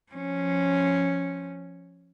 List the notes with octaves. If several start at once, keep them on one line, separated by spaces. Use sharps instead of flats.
F3 C#4